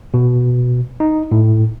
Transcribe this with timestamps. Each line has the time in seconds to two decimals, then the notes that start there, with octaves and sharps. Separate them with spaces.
0.14 B2
1.00 D#4
1.31 A2